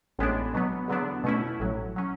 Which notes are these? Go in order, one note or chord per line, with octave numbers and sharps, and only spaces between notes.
A1 A2 G#3 B3 D4
B2 F#3 B3
E2 D3 F#3 B3 D4
B2 A3 C#4 E4
A1 A2 F#3
F#3 C#4